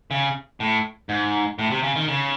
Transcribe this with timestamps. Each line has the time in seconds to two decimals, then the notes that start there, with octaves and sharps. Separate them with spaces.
0.11 C#3
0.60 A2
1.09 G#2
1.59 A2
1.71 C3
1.83 C#3
1.96 D#3
2.08 C#3